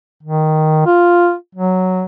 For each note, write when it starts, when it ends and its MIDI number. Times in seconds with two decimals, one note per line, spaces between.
0.23 0.85 51
0.86 1.34 65
1.55 2.04 54